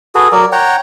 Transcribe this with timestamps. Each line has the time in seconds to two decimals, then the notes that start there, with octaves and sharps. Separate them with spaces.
0.15 F#4 G#4 A4 B4
0.32 F#3 A#4 D5
0.52 C#5 F#5 G5 A#5